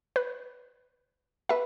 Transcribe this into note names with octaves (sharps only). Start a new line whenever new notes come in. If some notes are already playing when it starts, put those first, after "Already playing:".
B4
B4 E5